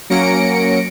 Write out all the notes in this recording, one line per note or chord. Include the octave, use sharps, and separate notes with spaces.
F#3 A#3 C#4 A#6 C#7 D7